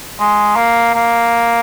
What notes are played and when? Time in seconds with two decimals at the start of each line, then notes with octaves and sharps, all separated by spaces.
0.20 G#3
0.56 A#3
0.94 A#3